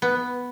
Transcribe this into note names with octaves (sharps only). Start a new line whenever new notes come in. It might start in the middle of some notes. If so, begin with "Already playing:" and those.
B3